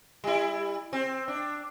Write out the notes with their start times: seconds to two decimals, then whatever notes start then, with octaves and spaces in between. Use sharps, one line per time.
0.24 G3 E4
0.93 C4
1.28 D4